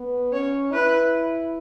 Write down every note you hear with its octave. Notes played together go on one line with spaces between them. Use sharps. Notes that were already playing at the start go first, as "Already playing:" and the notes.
Already playing: B3
C#4 C#5
E4 B4